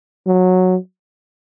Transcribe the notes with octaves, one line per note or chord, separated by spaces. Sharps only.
F#3